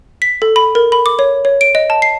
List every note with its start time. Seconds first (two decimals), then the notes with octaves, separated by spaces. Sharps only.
0.22 B6
0.42 A4
0.56 B5
0.75 A#4
0.92 B5
1.06 D6
1.19 C#5
1.45 C#5
1.61 D7
1.75 D#5
1.90 A5
2.02 C7